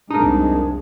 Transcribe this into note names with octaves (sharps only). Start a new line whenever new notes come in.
C2 F2 G#3 D4 D#4 A#4